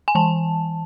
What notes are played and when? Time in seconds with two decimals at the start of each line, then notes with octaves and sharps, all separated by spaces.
0.08 G#5
0.15 E3 A5